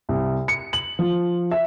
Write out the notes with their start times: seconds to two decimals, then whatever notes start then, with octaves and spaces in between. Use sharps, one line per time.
0.09 C2
0.48 C#7
0.73 F#7
0.99 F3
1.51 E5